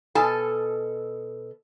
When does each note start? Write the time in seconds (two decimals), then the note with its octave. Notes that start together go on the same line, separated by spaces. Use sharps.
0.15 B2 A4 G#5 A5